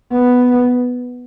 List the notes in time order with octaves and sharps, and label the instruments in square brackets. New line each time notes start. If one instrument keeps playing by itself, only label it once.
[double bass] B3